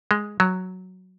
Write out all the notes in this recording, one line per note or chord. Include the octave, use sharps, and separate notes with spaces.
G#3
F#3